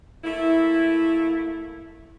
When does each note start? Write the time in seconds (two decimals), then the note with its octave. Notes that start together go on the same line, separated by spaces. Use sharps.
0.24 A3 A#3 E4